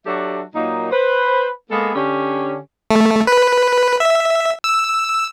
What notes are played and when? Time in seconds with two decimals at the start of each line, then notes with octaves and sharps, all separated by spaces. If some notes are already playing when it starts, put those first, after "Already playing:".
0.06 F#3 D4 F#4 G4 A4 E5
0.55 A#2 F#3 A#3 D#4
0.91 B4 C5
1.71 G#3 A#3 B3 G#4 A4
1.95 D3 C#4 G4
2.91 A3
3.27 B4
4.00 E5
4.64 E6